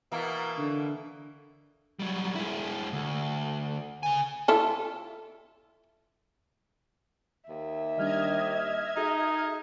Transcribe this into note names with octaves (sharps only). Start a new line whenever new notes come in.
B2 E3 A#3
D3
F#3 G3
G#3 E4
D2
C#3 G#5
E4 F4 A4
D#2 E5
D#3 G3 D4 D#5 F6 G#6
D#4 F#4 G#4 A4